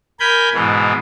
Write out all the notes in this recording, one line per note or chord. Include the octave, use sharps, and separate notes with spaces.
A#4 G#5 B5 G6
G#2 B2 E3